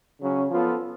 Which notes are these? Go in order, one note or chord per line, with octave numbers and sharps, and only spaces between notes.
C#3 F#3 C#4
F3 B3 F4 A4